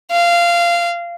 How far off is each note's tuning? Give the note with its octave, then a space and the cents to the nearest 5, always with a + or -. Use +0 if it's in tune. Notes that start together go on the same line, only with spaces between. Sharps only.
F5 -15